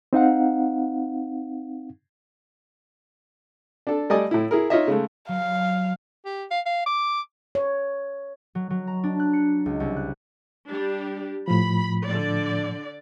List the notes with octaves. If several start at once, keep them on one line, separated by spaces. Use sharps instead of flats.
C4 D#4 F5 F#5
D4 A4
G3 A3 D5 D#5 G#5 D#6
A2 E4
E4 G#4 A#4
D#4 F4 C#5 D#5 E5
C#3 G#3 A3
F#3 F5
G4
F5
F5
D6
C#5
F#3
F#3
A#5
D4
F#6
C#7
C#2
C2
F#6
G3 D4 G4
A2 F3 B5
D3 D5